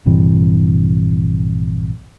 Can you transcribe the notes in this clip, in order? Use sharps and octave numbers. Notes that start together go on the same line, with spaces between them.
A#1 G2 C3 E3